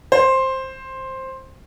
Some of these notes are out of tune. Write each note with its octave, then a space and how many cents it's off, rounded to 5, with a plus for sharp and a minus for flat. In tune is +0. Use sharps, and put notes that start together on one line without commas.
C5 +10